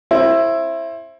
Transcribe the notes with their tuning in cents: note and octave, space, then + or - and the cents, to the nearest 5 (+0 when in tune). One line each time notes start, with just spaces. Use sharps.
C4 +30 E4 +10